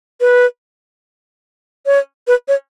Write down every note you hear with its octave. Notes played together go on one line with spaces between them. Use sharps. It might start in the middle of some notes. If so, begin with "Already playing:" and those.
B4
C#5
B4
C#5